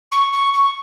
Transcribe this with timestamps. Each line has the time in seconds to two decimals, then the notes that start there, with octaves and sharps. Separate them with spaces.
0.11 C#6
0.32 C#6
0.53 C#6